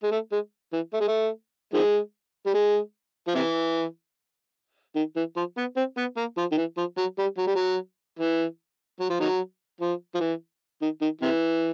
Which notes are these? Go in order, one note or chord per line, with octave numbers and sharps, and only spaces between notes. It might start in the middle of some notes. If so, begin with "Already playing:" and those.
G#3
A3
G#3
E3
A3
G#3
A3
D#3 F3 G#3
G3
G#3
F3
C3 E3
D#3
E3
F3
B3
C4
B3
A#3
F3
D#3
E3
F3
F#3
G3
F#3
G3
F#3
E3
F#3
F3
D#3 F#3
F3
F3
E3
D#3
D#3
C3 E3